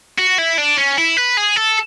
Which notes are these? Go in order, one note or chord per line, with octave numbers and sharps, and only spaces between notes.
F#4
E4
D4
C#4
E4
B4
G#4
A4